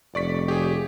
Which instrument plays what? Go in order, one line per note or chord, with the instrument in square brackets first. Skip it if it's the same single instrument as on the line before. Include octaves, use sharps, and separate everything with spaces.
[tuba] F1 [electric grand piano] D5 C#6 B6
[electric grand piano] G4 G#4